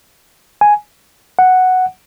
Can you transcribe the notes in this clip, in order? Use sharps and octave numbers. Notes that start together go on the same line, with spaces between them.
G#5
F#5